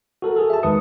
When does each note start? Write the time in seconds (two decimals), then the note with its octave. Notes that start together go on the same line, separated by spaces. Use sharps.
0.22 F#4 A4 A#4
0.36 G#4 A4
0.50 E5 A5
0.63 D#2 D#3 G#3 B4 D#6 C#7